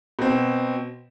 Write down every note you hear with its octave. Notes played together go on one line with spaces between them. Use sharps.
B2 C4